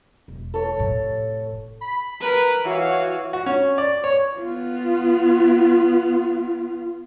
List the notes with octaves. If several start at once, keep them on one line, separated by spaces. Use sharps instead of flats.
E1
A4 C#5
F1 A2
B5
A#4 B4
E3 F#4 C#5 F5
F#4
C#4
D5
C#5
B3 F4